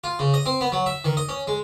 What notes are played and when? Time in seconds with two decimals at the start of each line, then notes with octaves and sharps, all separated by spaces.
0.04 F4
0.19 C#3
0.34 D#5
0.46 C4
0.61 B3
0.72 F#3
0.86 E5
1.04 D#3
1.17 D#5
1.29 C#4
1.47 G#3